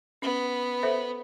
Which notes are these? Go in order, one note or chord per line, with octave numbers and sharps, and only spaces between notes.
B3 C#4
A4 C5 E5